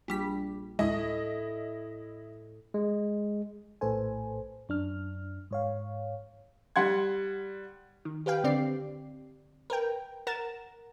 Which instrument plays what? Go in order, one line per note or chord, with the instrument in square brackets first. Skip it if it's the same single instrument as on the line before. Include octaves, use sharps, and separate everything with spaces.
[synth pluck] A#1 G3 B6
[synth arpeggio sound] D2 G#3 [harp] A2 [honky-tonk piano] E4 D#5
[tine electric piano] G#3
[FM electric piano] A#1 A2 A4 B4 C5 G#5
F#2 D4 F6
G#2 C#5 F5
[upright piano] G3 F#5 C6 G#6
[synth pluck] D#3
G4 B4 F5 G5
D3 C4 G4 D5 C7
A#4 B4 G5
A#4 F#5 A#5 A6 E7